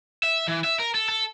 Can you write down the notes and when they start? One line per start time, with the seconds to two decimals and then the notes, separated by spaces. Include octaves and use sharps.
0.23 E5
0.48 E3
0.64 E5
0.79 A#4
0.95 A4
1.09 A4